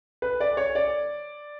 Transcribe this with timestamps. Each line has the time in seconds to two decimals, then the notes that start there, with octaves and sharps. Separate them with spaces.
0.22 B4
0.40 D5
0.57 C#5
0.75 D5